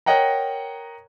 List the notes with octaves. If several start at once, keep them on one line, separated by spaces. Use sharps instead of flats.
A#4 C#5 D#5 F#5 G5 A#5